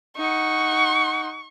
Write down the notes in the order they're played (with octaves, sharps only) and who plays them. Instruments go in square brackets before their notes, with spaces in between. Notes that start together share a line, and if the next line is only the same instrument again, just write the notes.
[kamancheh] D#4 F#5 [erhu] C#6